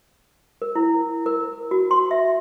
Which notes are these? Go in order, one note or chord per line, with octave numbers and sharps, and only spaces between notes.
A#4
E4
A#4
F#4
C6
E5